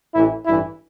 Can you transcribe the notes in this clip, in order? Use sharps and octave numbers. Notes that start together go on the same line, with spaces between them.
A1 A2 E3 E4
A1 G2 E3 E4